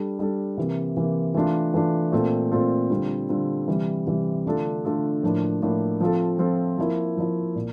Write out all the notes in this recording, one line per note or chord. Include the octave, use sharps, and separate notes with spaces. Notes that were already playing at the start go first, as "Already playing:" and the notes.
Already playing: G3 D4 A4
G3 D4 A4
C3 E3 A#3
C3 E3 A#3
E3 A3 D4 F4
E3 A3 D4 F4
A#2 A3 C4 F4 A4
A#2 A3 C4 F4 A4
D3 G3 C4 F4
D3 G3 C4 F4
C3 E3 G3
C3 E3 G3
D3 A3 D4 F4 A4
D3 A3 D4 F4 A4
A2 F3 A#3 D4
A2 F3 A#3 D4
F3 C4 F4 A4
F3 C4 F4 A4
F3 A#3 E4
F3 A#3 E4
A#2